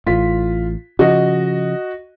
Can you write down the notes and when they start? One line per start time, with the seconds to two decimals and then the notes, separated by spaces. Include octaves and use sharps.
0.07 A1 A2 F4 B6
0.99 C#3 F3 F#4 D#5